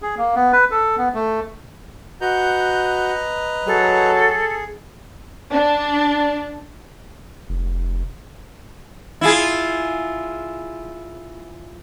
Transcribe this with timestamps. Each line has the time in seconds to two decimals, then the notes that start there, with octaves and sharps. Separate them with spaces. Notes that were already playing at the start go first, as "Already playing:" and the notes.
0.02 G#4
0.18 A#3
0.36 B3
0.53 B4
0.71 A4
0.97 B3
1.14 A3
2.21 F#4 B4 D#5 A#5 G6
3.67 F#3 G#4 A4
5.52 D4
7.49 F1
9.21 E4 F4 G#4